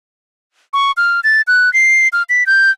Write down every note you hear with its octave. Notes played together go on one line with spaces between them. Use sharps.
C#6
F6
A6
F#6
C7
F6
B6
G6